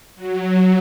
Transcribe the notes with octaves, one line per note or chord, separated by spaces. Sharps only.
F#3